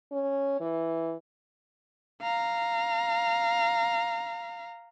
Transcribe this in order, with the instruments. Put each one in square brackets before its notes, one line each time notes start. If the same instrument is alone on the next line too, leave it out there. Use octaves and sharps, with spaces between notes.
[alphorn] C#4
E3
[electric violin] F5 A#5